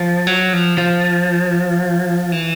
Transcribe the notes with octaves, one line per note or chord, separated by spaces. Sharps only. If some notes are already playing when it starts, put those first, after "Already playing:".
Already playing: F3
F#3
F3
F3
E3